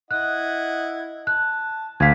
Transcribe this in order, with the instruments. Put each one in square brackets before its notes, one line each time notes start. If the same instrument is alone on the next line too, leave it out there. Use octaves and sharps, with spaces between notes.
[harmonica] E4 D#5 F#5 [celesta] F#6
[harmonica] A5 [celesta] F#6
[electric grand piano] D2 F5 [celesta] G#6 B6